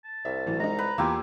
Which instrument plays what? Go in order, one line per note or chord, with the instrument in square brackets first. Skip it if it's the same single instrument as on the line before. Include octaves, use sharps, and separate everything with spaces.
[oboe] A5
[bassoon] C2 [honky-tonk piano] E5
[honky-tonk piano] A2 E3 F#3
[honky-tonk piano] G#3 D#4 [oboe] A#5
[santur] B4
[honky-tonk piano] E2 E6 G#6 [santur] A#3 F4 G4